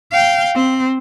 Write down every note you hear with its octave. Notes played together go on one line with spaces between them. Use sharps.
F5 G5
C4